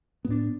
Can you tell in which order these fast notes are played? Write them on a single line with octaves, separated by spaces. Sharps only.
B3 A2 D4